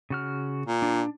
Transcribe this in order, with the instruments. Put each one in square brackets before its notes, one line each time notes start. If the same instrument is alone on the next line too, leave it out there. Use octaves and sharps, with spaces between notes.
[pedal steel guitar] C#3 F#4 F6
[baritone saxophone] A#2
[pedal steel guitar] D4